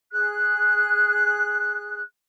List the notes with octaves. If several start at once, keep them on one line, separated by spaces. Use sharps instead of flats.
G#4 F#6